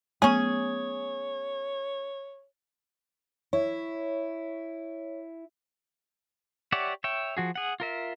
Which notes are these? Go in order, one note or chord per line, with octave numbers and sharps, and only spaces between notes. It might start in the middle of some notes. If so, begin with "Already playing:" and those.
F#3 A3 B3 C#4 G#4 C#5
E4 C#5
G4 C#5 D5 E5 F#5
C#5 E5 G5
F3 F#4 G#4
G#4 F#5
F4 A#4 E5